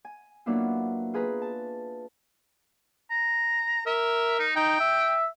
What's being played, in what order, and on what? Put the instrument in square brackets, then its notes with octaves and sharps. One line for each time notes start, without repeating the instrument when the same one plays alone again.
[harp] G#5
F#3 A#3 B3 D4 E4 F4
F4 G#4 B4 A#5
A5
[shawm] A#5
[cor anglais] A#4 [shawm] E5
[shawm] D#4
[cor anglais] D#4 [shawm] G5
[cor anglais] E5